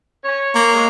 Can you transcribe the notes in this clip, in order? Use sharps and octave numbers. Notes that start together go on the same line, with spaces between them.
C#5
A#3
G#3